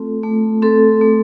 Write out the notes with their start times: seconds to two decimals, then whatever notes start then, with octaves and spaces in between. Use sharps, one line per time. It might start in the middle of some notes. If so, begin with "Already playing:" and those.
Already playing: A3 C4 F4 A4
0.23 A3
0.62 C4 A4
1.01 A3